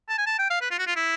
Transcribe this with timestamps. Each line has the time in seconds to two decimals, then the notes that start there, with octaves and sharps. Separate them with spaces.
0.09 A5
0.18 G#5
0.26 A5
0.39 G5
0.50 F5
0.62 B4
0.71 F4
0.79 F#4
0.87 F4
0.96 E4